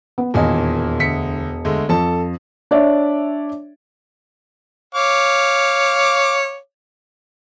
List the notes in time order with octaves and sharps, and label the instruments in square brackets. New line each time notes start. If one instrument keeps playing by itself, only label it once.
[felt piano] B3
[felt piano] E1 D#5 [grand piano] D#2 A#2 G#5
[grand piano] D2 B6 C#7
D2 G#3 A3
[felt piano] F2 [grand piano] A4 A5
[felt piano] D4 C#5 D5 E5
[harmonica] C#5 F5 D6